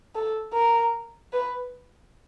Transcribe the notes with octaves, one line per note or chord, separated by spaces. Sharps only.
A4
A#4
B4